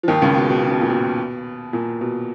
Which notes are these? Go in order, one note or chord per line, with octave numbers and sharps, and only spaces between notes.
F3
D#2 D#3
C#2 C#3
B2
B2
C#3
B2
A#2
B2
A#2
B2